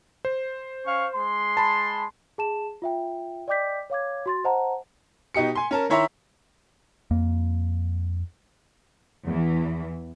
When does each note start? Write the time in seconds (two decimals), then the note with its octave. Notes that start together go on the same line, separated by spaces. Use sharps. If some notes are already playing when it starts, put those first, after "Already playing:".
0.25 C5
0.85 C#4 F5 C#6
1.15 G#3 C6
1.57 A5 B5
2.38 G#4 A5 E7
2.82 F4 E5 G5
3.48 D5 D#5 G5 D6 G6 B6
3.90 C#5 F5 D6 G#6
4.26 F#4 C6 A6
4.44 C5 D#5 F#5 A5 A#5
5.34 B2 D#4 G4 C#7
5.55 G#5 C6
5.71 C#4 A#4 A5
5.90 D#3 E4 C#5 E5 A#5 C6
7.11 F2 A#3
9.25 E2 E3